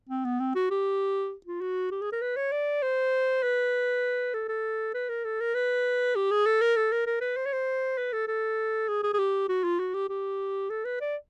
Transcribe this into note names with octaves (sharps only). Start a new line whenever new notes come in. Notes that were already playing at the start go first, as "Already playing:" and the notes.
C4
B3
C4
F#4
G4
F4
F#4
G4
G#4
A#4
B4
C#5
D5
C5
B4
A4
A4
B4
A#4
A4
A#4
B4
G4
G#4
A4
A#4
A4
A#4
A#4
B4
C5
C#5
C5
B4
A4
A4
G#4
G#4
G#4
G4
F#4
F4
F#4
G4
G4
A4
B4
D5